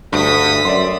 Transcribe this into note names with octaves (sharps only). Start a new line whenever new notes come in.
D2 G2 D#6 B6
F#2 D5 E5 C6